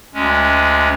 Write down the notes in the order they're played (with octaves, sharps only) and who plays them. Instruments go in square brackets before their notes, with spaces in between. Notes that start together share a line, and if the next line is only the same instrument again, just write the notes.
[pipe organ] D2 G#3 C#4